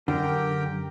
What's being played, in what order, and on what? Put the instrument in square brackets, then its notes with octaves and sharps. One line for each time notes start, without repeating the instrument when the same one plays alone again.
[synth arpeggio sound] F#2 [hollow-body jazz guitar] D3 [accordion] G4 A#4 G5